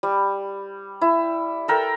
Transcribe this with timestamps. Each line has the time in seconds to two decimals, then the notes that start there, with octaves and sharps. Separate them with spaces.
0.03 G3
1.01 E4
1.68 A4 A#4 G5